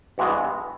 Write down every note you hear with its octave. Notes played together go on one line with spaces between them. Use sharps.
G2 E3 G#3 B3 F#4